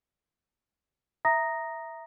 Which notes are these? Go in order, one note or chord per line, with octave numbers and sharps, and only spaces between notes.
E5 A#5 D#6 A#6